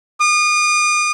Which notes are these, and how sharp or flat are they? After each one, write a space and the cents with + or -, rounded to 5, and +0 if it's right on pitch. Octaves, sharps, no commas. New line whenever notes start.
D#6 -40